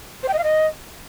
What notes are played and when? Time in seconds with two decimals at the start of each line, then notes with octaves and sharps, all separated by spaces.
0.23 C5
0.28 G5
0.33 D#5
0.38 F5
0.44 D#5